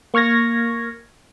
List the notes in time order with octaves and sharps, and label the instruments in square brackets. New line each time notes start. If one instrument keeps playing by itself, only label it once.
[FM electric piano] A#3 C#6 F6 G#6 A#6